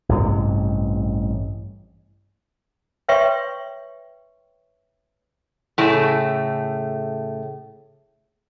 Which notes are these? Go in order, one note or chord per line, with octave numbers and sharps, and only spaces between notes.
A1 G2 C3 G#3
B4 C#5 E5 G5 C6 C#6
A2 C#3 A3